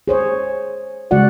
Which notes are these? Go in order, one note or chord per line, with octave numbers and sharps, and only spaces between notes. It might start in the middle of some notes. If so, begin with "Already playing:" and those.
G#4 C5 C#5
C#3 G#3 F#4 D5 F#5